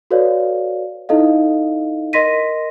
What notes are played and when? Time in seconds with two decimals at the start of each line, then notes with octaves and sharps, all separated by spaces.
0.11 F#4 A4 B4 C#5 D5 F5
1.09 D#4 E4 A4 D#5 F5
2.13 A#4 D#5 C6 A#6 B6 D#7